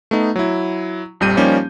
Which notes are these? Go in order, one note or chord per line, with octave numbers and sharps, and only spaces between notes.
A3 B3 D#4
F#3 E4
A#1 F2 G3 G6 D#7
F3 G3 A#3 C#4 D#4 G4